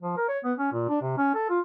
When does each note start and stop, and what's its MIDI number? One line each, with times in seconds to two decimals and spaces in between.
0.03 0.16 53
0.17 0.27 70
0.29 0.39 73
0.44 0.53 59
0.58 0.71 61
0.72 0.89 46
0.89 0.97 62
1.02 1.15 48
1.18 1.34 61
1.35 1.46 69
1.50 1.60 65